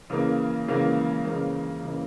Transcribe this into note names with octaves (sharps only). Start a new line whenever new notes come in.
C#3 E3 A#3
C#3 E3 A#3
C#3 E3 A#3
C#3 E3 A#3